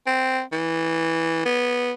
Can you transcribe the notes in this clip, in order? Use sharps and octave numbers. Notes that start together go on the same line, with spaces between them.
C4
E3
B3